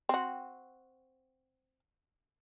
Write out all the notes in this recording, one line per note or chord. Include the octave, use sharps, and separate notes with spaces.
C4 F#4